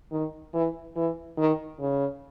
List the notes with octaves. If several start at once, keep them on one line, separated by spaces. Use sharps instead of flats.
D#3
E3
E3
D#3
C#3